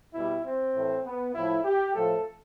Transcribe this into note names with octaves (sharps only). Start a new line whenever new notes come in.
B2 G3 E4
C4
A2 E3 A3
B3
A2 F3 A3 E4
G4
A2 F3 A3 A4